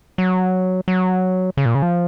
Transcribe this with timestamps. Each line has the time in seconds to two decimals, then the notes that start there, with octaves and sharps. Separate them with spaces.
0.18 F#3
0.88 F#3
1.57 C#3
1.66 A#2
1.75 C#3
1.82 F3